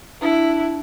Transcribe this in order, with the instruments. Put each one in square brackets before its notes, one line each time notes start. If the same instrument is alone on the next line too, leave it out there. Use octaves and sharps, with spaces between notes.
[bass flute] D4 [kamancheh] E4